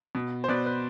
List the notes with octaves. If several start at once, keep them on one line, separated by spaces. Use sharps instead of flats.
B2
C5
B2 B4 D5
B4